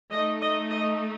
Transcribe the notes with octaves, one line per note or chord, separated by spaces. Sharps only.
A3 D#4 D#5
D#5
D#5